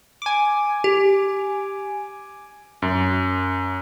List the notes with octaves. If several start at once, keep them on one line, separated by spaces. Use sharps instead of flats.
G#5 D6
G4
F#2